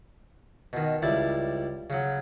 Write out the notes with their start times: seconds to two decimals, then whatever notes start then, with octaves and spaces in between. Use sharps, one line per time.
0.73 B2 D#3
1.02 C#2 G3 E4 A5
1.90 C#3 F#3